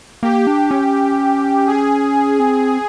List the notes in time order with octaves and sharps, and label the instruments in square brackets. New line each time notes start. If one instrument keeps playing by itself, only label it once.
[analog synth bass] A#3 [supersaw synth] G4
[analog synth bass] D4
C#4
[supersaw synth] G#4
[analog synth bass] C4